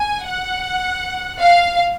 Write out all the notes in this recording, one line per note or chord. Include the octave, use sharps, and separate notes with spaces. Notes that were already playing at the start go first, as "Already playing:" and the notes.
Already playing: G#5
F#5
F5